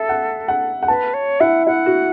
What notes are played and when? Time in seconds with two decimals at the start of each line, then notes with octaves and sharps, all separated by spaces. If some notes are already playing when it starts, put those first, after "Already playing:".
Already playing: A4 E5
0.09 F#5
0.48 F#5
0.83 F#5
0.88 B4 A5
1.14 C#5
1.40 E4 F#5
1.67 E4 F#5
1.86 F#4